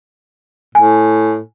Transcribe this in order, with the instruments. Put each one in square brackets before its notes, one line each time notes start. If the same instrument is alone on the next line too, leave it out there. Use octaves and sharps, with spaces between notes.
[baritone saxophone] A2 [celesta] G#5